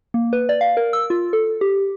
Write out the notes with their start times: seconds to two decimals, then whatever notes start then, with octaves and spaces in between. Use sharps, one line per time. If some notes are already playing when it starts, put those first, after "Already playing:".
0.14 A#3
0.33 B4
0.49 D5
0.61 F5
0.77 A#4
0.93 E6
1.10 F4
1.33 A4
1.61 G4